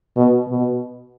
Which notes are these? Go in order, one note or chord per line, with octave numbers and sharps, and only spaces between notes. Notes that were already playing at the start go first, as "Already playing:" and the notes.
B2
B2